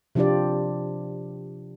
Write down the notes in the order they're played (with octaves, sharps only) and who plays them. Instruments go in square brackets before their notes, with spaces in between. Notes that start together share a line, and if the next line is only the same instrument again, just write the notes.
[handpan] C3 F3 D4 F4 G4 D5